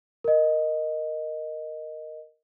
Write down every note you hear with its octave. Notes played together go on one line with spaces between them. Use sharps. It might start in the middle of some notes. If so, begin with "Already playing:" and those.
A#4 D#5